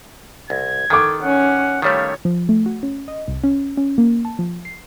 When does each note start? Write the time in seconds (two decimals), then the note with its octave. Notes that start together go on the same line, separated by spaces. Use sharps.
0.50 C2 G#6
0.90 D#3 A4 C#6 D6
1.23 C#4 F#5
1.82 D#3 G3 A3 C#5 F5
2.25 F3
2.49 A3
2.66 F#4
2.83 C#4
3.08 D#5
3.28 C2
3.44 C#4
3.77 C#4
3.98 A#3
4.25 A5
4.39 F3
4.65 C7